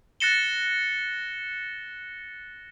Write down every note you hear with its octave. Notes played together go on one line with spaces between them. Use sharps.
F#6 A6 A#6 C#7 E7 G7